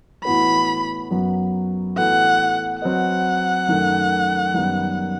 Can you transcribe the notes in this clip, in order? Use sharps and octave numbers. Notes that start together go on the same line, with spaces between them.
A2 E3 B3 F#4 B4 B5
F#2 F#3 B3 F#4
A2 E3 B3 F#4 A4 F#5
F#3 C4 F#4 B4 D#5 F#5
F#2 D#3 A3
F#2 D#3 G3 B3